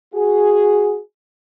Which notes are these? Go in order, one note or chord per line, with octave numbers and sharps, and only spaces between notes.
F#4 G#4